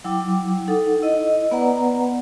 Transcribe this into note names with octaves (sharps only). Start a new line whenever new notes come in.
F#3 E4 G5 D6
D#4 A4 F#5
E4 D#5
B3 B4 D5 F#5 A#5